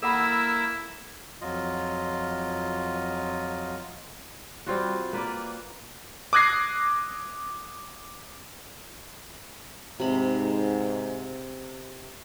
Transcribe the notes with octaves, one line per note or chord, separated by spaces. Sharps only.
A#3 E4 A4 F#5 B5 E6
F2 F#3 F4 D#5
G3 C4 F4 F#4
A#3 B4 D5
D6 D#6 F#6 G#6 A#6 C7
G#2 C3 B5